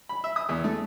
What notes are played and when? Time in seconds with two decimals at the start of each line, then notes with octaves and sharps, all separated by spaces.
0.09 B5
0.24 E5
0.36 D#6
0.49 E2
0.64 A3